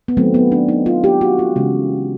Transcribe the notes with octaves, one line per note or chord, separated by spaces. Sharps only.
B3
D#3 F#3 A3 C4
B3
D4
D#4
F4
G4
F#4
F4
C#3 E3 G#3